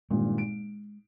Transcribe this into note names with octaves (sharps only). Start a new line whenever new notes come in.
G#1 G2 A#2 G#3
D7